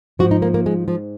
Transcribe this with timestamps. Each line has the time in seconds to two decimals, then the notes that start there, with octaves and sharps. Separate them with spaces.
0.19 G#2 F3 F#4
0.31 D#4
0.42 A#3
0.54 A#3
0.66 G#3
0.88 F3